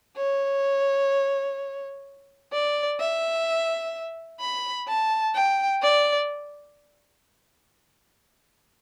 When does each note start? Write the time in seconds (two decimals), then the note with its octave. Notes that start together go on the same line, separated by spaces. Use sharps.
0.17 C#5
2.52 D5
3.00 E5
4.40 B5
4.88 A5
5.34 G5
5.82 D5